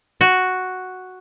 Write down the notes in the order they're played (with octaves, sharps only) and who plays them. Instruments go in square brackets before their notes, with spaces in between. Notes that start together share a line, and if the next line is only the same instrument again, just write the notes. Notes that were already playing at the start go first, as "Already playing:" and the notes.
[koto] F#4